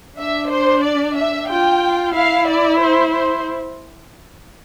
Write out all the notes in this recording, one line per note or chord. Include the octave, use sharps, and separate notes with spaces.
D4 E5
C5
D5
E5
F4 G5
E4 F5
D5
C5
C5